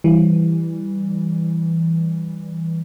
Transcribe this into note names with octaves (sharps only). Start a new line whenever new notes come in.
E3 G3